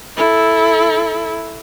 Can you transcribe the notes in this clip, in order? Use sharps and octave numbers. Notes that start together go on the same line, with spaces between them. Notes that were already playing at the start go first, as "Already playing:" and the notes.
E4 A4